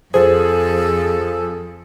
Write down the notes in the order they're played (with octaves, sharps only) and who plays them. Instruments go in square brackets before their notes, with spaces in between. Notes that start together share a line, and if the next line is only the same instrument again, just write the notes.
[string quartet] F2 [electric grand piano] F3 G#4 [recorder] A4 [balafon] C5